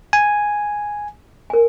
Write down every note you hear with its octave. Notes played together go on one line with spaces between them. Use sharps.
G#5
A#4 G#5